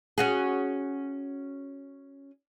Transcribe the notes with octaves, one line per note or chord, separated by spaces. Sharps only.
C#4 F#4 G#4